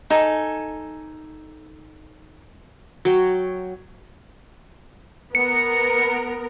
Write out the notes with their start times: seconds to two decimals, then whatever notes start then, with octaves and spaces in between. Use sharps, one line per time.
0.10 D#4 A4 G#5
3.05 F#3 G5
5.35 B3 A#4 C#7